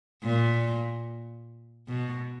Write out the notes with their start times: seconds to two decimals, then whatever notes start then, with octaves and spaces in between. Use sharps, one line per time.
0.23 A#2
1.88 B2